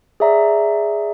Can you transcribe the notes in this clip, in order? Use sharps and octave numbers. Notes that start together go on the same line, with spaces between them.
G#4 C#5 D5 E5 A#5